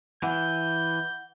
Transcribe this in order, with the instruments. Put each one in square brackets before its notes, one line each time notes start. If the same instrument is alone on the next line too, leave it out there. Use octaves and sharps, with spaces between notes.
[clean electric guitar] E3 [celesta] F#5 [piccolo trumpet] G6